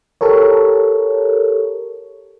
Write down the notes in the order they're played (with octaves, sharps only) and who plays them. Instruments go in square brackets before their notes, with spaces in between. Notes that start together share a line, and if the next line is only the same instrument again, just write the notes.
[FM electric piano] G4 A4 A#4 C#5